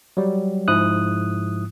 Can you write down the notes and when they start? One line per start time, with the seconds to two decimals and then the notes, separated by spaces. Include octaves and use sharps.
0.17 F#3 G3
0.68 G#2 F3 E4 D#6 F#6